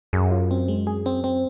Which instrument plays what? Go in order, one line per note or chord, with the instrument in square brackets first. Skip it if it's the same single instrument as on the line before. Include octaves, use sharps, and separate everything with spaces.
[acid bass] F#2 [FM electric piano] G#4
[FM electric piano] F4
C4
G#3
G#4
C4
C4